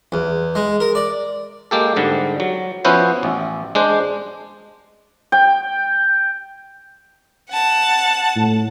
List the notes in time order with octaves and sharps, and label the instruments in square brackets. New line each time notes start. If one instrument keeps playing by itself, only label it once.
[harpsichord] E2
G#3
A#4
D5
[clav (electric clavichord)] G#3 A#3 G4 A4
G#2 D3 G3
F#3
F3 B3 C#4 E4 F#4 C5
A1
G#3 D4 C5
[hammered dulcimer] G5
[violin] F#5 A5
[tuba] A2